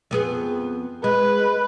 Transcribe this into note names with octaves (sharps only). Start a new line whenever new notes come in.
F2 B3 G#4
G#3 B4